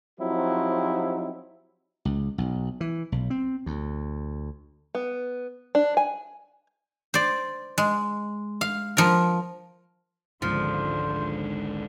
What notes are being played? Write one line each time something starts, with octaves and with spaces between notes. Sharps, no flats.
F3 F#3 C4 D#4 E4 G4
C#2
B1
E3
B1
C4
D2
B3
D4
G#5
C5 D5
G#3
F5
F3 A#4
G#1 C#2 G#2 D3 F3 C5